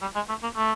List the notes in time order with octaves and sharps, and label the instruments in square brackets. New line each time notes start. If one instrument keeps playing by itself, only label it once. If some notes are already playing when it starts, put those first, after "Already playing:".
[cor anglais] G3
G#3
A3
A#3
A3